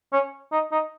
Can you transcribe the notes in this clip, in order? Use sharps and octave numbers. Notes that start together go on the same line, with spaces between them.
C#4
D#4
D#4